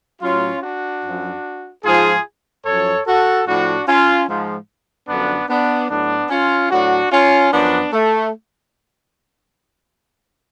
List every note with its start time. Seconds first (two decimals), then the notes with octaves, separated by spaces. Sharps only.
0.22 A2 F#3 C#4 F4
0.62 D4 F#4
1.03 F#2 F3
1.84 G#2 F3 F4 G#4
2.65 F#2 F3 A4 C#5
3.06 F#4 A4
3.46 A2 F3 D4 F#4
3.87 C#4 F4
4.28 G#2 F3
5.08 F#2 D3 F3 B3 D4
5.49 B3 D4
5.90 A2 F#3 B3 D4
6.30 C#4 F4
6.71 A2 F#3 D4 F#4
7.11 C#4 F4
7.52 F#2 F3 B3 D4
7.93 A3